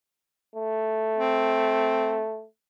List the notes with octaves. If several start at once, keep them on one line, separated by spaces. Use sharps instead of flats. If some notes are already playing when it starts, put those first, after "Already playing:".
A3
C4